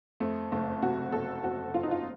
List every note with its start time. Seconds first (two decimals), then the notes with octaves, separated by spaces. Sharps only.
0.20 F2 A3
0.52 F#1 A3
0.82 C3 F#4
1.12 F#1 A4
1.43 F2 F#4
1.74 F#1 F4
1.83 D#4
1.91 F4